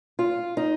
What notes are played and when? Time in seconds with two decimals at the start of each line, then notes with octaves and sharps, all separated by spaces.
0.19 F4
0.57 D#4